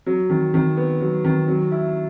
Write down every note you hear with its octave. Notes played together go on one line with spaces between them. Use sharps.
F#3
D#3
D#3
B3
F#3
D#3
F#3
E4